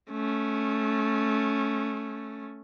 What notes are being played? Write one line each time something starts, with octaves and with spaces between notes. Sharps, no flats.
A3 C#4